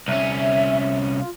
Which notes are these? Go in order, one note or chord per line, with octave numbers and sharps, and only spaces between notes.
C2 C#4 E5
F4